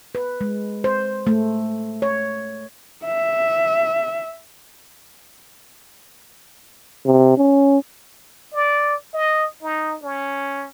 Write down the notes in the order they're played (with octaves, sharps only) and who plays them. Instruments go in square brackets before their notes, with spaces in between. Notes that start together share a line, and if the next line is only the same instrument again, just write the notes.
[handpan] B4
G#3
C5
A3
C#5
[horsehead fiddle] E5
[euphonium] C3
C#4
[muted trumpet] D5
D#5
D#4
C#4